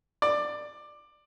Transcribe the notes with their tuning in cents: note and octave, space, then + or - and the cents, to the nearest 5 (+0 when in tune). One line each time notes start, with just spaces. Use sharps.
D5 +15